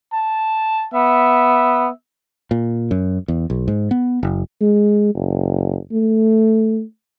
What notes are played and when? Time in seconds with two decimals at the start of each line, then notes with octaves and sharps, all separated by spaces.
0.13 A5
0.94 B3 E5
2.51 A#2
2.91 F#2
3.28 E2
3.50 B1
3.68 G#2
3.91 B3
4.23 F#1
4.61 G#3
5.14 F#1
5.92 A3